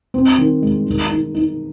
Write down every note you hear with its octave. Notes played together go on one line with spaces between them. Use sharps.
C4
D#3
G#3
D#3
D#4
D#4